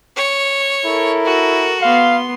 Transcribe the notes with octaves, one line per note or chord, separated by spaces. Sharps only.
C#5
E4 A4 A#4
F#4
B3 F5 C6